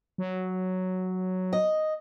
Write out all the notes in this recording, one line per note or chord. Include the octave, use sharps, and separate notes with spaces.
F#3
D#5